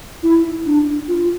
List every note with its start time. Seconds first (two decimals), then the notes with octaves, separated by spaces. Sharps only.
0.23 E4
0.66 D4
1.08 F4